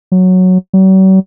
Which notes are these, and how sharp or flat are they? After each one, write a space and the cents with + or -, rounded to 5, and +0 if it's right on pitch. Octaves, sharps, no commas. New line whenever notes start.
F#3 -5
F#3 +45